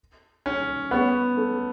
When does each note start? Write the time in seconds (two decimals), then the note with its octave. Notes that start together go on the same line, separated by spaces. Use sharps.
0.46 C#4
0.91 B3 C#4 G#4 C#5 F#5
1.37 A3